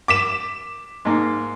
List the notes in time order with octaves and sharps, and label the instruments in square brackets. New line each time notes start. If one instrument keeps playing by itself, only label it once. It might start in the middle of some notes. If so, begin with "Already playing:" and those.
[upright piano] D6 B6 E7
[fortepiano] G#2 A#3